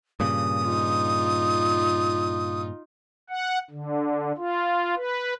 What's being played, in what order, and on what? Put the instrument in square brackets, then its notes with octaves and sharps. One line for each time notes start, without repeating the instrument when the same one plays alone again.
[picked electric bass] G2 A#2 C#3 [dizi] D#6
[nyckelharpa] D#4 F4
[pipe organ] F#5
D3
F4
B4